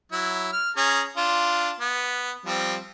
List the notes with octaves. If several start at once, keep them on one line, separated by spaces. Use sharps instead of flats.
F#3 E4
F6
C#4 G#4 A#5
D4 F4
B3
F3 G3 C4